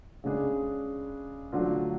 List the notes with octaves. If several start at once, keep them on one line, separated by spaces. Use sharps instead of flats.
C#3 G#3 D4 G#4
D3 F#3 A3 D4 F4